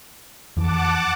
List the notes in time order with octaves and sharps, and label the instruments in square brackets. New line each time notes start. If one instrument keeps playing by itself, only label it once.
[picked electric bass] F2 E3 [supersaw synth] F#5 A5 D6